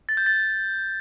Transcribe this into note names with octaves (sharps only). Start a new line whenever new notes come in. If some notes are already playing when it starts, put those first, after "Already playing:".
A6
G6
A6